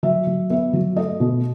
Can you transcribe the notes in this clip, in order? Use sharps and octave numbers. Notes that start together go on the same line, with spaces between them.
F#3 E5
F#3
B3 E5
F#3
A3 D#5
B2